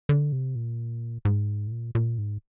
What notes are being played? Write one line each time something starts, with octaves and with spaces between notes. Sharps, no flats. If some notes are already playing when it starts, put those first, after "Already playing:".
D3
C3
A#2
G#2
A2
A#2
A#2
G#2